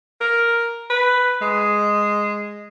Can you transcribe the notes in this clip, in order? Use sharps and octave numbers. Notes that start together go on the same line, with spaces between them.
A#4
B4
G#3